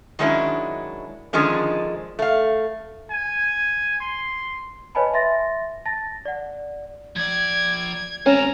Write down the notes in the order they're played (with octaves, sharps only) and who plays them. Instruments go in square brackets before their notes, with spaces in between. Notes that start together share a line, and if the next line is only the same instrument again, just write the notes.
[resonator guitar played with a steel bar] D#3 F#3 G#3 C#4 D4 E4
D3 D#3 F3 G#3 C#4 D4
A3 F5
[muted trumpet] G#5
C6
[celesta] B4 C#5 D#5 G#5 A5 B5
E5 C6 A6 A#6
A5 A6 A#6
D5 F#5
[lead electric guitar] F3 D5 [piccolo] G#6
[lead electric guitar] G#3 C4 [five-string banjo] C#4 [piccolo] A#5